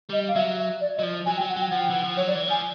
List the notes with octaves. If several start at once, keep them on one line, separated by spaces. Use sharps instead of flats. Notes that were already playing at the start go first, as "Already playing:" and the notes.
G3 D#5
F5
F#3 E5
E5
D5
D#5
F#3
F3
F#3 G#5
G5
F#3
F#5
F#3 G5
F3 F#5
G5
E3 F#5
F3
F#3 C#5
D5
E3
F3 G#5